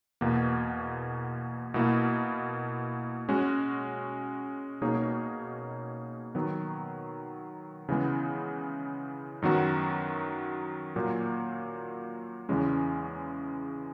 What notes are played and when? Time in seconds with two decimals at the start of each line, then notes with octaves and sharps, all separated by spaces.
0.21 E2 B2 A#3
1.74 B2 A#3 E4
3.29 G#3 C#4 F#4
4.82 B2 A#3 D#4 G#4 C#5
6.35 D#3 F#3 B3
7.89 C#3 E3 G#3 B3
9.42 F#2 D#3 F#3 B3 F#4
10.96 A#2 F#3 A#3
12.49 E2 C#3 E3 G#3 C#4